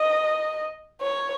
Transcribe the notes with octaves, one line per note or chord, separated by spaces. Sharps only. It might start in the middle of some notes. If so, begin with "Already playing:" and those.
Already playing: D#5
C#5